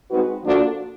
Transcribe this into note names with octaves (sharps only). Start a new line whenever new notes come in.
G#3 C4 D#4 F#4 B4
F3 A#3 D4 F#4 A4